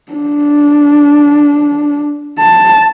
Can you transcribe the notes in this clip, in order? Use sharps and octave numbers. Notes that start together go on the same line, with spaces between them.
D4
A5